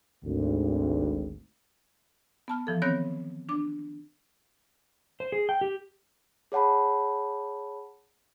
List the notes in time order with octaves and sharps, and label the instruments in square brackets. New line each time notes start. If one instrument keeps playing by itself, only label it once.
[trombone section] G#1 D2
[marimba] B3 A5 F6
E3 F3 A4
D#3 B3 C4 C#5 F#6 A#6
D4 D6
[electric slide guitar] C5
G#4
G5
G4
[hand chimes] G#4 C#5 F#5 A5 B5